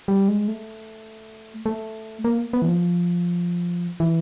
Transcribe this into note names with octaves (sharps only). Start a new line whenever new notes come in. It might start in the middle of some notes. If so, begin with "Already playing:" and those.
G3
G#3
A3
A3
A#3
B3
E3
F3
E3